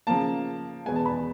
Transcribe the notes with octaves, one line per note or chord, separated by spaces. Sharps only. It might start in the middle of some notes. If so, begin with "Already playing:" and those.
C#3 F3 A#3 A5
E2 B2 G#3 B3 G#5
A5
B5